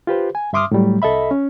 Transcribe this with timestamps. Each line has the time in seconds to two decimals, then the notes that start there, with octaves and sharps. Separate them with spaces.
0.07 F4 G4 B4 C5
0.35 G#5
0.53 G2 E5 C6 D6 D#6 F6
0.71 A2 F#3 G3 A3
1.02 C2 A4 D#5 E5 B5
1.31 C#4